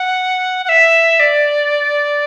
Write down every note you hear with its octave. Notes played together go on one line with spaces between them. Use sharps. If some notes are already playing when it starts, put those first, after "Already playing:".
Already playing: F#5
F#5
E5
D5